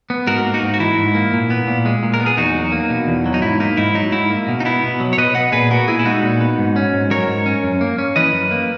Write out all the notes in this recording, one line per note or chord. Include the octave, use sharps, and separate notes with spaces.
B3
G#2 F#4 A#4
A#3
D#4 F#4
G#2
F#4
E3 E4
G#2
A#3
A#2
B3
A#2
G#3
A#2
A#4
B3
G#4
E2 D#4 F#4
F#3
A#3
B2
E2
F#3
D#4
G#2 E4
A#3 D#4
G#2 E4
F#3 D#4
G#2 E4
A#3
B2
D#4
B3 E4
B2
F#3
C#5
B2 B4 D#5
B3 D#5 F#5
A#2 G#4 B4
B3 F#4 A#4
A#2 E4 G#4
E4
G#3 D#4 F#4
A#2
B3
G#2
C#4
G#2
F#3 A#4 C#5
G#2
C#4
F#2
A#3
C#4
E3 B4 D#5
F#2
A#3